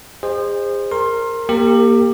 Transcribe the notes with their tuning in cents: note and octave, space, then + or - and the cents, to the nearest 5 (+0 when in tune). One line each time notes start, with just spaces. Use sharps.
G#4 -35 C5 +0 D#5 -30
A#4 -10 C6 +25
A#3 +5 G4 +15 A#4 -30